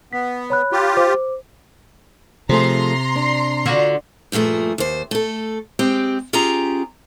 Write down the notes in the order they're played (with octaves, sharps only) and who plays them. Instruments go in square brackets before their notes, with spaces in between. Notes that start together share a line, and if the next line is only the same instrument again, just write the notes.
[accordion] B3 [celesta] B6
[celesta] C#5 B5 F#6
[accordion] F4 G4
[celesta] C5 D6
[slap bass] C3 [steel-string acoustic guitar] F3 A3 G#4 [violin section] A#5 C6 C7
[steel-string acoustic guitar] D4
[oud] D3 F4 F#4
[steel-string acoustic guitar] G2 A#2 F3 A3 G#4
D#2 C5
A3 A4
G#3 C4 G4
C#4 F4 G4 G#4 A#5